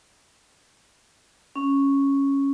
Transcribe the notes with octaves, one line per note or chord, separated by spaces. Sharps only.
C#4